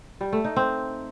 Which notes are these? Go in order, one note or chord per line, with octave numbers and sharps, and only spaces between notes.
G3
A3
D#4
C4